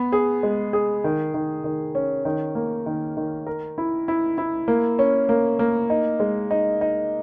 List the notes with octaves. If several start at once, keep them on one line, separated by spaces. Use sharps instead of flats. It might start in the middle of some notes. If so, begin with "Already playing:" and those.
Already playing: B3
G#4
G#3
G#4
D#3
D#3
D#3
C#4
D#3
A#3
D#3
D#3
A#4
E4
E4
E4
A#3
C#4
A#3
A#3
D#4
G#3
D#4
D#4